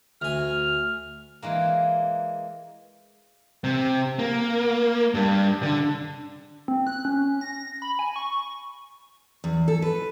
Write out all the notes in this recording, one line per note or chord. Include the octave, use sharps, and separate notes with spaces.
D2 G#5 F6
E3 G#3 A#3
C3
A#3
G2
D3
C4
F#6
C#4
A#6
B5
G#5
C#6
E2
A4
B4